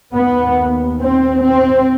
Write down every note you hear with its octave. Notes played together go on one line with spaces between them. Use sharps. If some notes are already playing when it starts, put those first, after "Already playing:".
D#2 B3
C4
C4